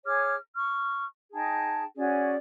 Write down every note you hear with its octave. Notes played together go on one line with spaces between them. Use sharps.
G#4 C#5 D6 F6
C#6 F6
D#4 G#4 G5 A5
C#4 F#4 G#4 D5